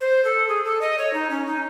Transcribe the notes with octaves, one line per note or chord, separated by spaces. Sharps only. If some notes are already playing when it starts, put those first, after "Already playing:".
C5
A4
G#4
A4
D#5
C#5
D#4
C#4
D#4